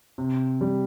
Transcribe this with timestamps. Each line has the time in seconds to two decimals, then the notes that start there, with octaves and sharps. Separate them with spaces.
0.18 C3
0.61 G3